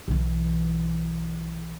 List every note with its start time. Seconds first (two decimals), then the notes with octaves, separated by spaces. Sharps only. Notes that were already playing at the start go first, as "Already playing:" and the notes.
0.08 B1 E3